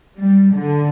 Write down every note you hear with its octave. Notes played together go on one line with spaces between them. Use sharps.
G3
D3